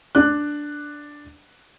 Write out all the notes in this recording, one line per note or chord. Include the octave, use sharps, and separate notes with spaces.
D4 D5 F#6